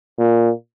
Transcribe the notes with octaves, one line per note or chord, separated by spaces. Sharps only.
A#2